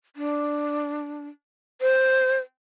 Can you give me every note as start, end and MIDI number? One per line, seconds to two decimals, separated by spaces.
0.16 1.28 62
1.82 2.39 72